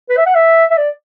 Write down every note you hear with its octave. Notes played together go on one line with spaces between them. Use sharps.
B4
E5
F#5
E5
E5
D5